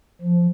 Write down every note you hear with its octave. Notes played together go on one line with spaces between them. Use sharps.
F3